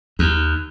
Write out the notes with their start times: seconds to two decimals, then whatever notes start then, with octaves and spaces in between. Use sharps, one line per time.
0.19 D#2